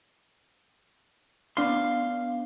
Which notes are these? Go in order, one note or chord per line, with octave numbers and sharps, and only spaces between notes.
B3 D4 F5 C6